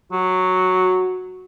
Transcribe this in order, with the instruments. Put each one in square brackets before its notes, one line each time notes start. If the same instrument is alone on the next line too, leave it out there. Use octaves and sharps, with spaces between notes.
[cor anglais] F#3 [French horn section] F#4